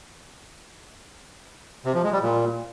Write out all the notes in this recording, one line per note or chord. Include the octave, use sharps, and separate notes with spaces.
C3
F3
G#3
G3
A#2